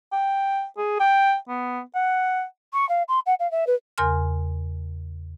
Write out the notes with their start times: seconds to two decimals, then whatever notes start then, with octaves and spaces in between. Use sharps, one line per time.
0.13 G5
0.78 G#4
1.00 G5
1.48 B3
1.95 F#5
2.73 C#6
2.89 F5
3.08 C6
3.26 F#5
3.39 F5
3.51 E5
3.67 B4
3.98 E2 C#3 A#4 G#5 C6 F6